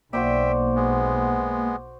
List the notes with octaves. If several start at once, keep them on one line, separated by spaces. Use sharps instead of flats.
B1 A#3 F#4 C5 D5 E5 G5
G#3 B3